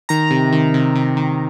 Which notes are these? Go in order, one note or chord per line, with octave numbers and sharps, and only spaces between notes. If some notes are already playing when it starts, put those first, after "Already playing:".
D#3 A#5
C3
D#3
C3
C3
D#3